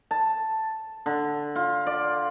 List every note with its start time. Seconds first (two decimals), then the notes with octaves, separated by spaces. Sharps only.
0.11 A5
1.06 D3
1.56 F4
1.86 D5